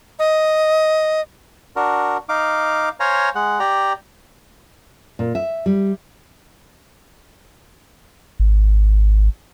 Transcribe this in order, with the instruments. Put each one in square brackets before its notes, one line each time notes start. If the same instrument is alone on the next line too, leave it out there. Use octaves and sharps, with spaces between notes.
[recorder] D#5
[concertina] D4 F#4 A#4
D#4 F5 D6
C5 C#5 F5 G#5 A#5
G#3 F#5
G4 D5 G5 A#5
[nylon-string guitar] A#2
E5
G3
[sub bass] G#1